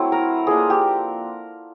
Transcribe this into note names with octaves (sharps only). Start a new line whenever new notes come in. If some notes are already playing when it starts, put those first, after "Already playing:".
Already playing: F#3 A3 C4 E4
A#4
F3 A#3 D4 G#4
G4